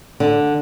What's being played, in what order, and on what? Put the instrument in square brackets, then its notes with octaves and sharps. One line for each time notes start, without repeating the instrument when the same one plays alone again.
[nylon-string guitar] D3